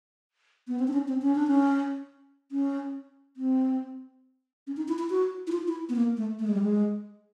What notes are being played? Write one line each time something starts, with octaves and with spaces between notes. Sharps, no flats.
B3
C4
D4
C#4
C4
C#4
D4
C#4
C#4
C4
C#4
D#4
E4
E4
F#4
E4
F4
E4
B3
A#3
A3
A3
G#3
G3
G#3